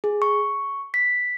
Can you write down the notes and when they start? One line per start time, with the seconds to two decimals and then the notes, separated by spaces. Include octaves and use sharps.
0.04 G#4
0.22 C#6
0.94 B6